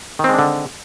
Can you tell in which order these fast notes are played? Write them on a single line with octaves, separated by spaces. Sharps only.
D#3 C4 G#3 D4 D3